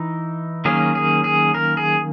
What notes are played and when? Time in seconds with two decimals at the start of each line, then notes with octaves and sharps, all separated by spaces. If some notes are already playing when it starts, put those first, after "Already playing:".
Already playing: E3 D#4
0.65 D#3 F#3 A#3 C#4 G#4
0.95 G#4
1.24 G#4
1.54 A#4
1.77 G#4